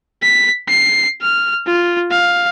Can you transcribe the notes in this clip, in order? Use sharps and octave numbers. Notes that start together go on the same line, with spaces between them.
B6
C7
F6
F4
F5